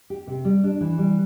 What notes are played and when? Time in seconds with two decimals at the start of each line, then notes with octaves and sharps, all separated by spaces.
0.10 G4
0.27 C3
0.45 G3
0.64 D4
0.81 E3
0.98 G3